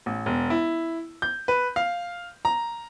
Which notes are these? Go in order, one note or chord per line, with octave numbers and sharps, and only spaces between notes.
A1
E1
E4
G6
B4
F5
A#5